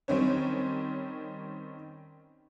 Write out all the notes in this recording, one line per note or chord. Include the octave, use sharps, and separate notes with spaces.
D#3 G3 C4 C#4 C#5